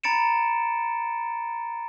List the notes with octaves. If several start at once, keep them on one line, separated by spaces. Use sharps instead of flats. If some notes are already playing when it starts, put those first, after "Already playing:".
A#5 B5 A6 C#7 D7 E7